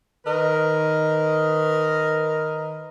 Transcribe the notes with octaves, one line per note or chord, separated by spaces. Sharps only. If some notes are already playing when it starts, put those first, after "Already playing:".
D#3 A#4 B4 D#5